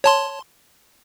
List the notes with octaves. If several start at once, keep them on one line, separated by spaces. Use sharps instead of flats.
C#5 A5 C6